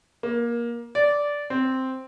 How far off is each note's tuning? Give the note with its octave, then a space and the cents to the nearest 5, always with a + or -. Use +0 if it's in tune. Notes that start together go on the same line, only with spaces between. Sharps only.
A#3 +20
D5 -10
C4 +0